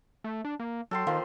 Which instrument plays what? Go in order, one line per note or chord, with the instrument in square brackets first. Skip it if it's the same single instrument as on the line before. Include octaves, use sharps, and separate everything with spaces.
[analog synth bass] A3
D4
A#3
[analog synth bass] F#3 [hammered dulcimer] A4 G5 C6
[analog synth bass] D#3 [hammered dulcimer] F3 A#3